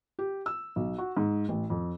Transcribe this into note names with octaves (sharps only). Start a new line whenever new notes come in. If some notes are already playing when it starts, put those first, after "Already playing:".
G4
E6
B1
F#4
G#2
A1
F2